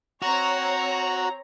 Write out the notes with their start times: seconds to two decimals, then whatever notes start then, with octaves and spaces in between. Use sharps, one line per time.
0.22 C4 F#4 C#5 A#5